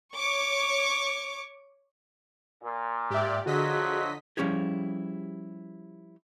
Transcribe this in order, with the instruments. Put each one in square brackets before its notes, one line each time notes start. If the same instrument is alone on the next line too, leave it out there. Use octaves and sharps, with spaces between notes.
[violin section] C#5 C#6 D6
[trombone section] A#2
[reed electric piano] G#2 E5 [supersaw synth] G4 D5
[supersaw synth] D3 D#5 B6 [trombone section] F3 F#3 [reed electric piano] F#4 G#4
[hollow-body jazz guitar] F3 G3 C#4 E4 G4 G#4